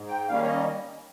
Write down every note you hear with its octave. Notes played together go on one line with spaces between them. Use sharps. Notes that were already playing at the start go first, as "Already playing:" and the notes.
Already playing: G#2
G5
D#3 G3 A#3 C#4 F5
C#5
D#5